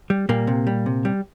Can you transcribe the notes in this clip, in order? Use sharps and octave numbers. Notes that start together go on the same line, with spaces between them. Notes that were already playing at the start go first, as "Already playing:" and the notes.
G3
A#2 G3 A#3
C3
G3
C3
G3